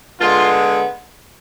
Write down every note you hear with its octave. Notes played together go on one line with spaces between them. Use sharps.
D3 G#3 B3 F4